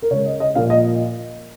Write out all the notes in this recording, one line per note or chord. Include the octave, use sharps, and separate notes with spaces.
A#4
C#3 G#3 C#5
D#5
D#5
A#2 F3 A#3 F5
D#5